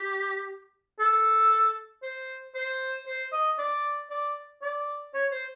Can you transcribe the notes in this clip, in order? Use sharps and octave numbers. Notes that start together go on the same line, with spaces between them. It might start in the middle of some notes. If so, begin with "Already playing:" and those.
Already playing: G4
A4
C5
C5
C5
D#5
D5
D5
D5
C#5
C5